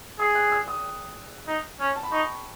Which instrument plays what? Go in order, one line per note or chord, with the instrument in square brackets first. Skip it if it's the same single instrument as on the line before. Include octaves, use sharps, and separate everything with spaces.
[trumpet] G#4 [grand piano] D#6
[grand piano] F#6
E6
D#6
[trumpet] D#4
C#4
[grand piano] A5
B5
[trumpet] D#4 [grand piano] C#6